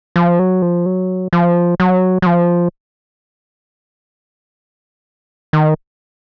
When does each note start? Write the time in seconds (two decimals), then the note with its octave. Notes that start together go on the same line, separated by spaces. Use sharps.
0.16 F3
0.39 F#3
0.62 F3
0.86 F#3
1.33 F3
1.80 F#3
2.22 F#3
2.26 F3
5.53 D#3